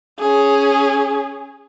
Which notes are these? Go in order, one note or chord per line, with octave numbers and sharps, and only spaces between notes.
C#4 G#4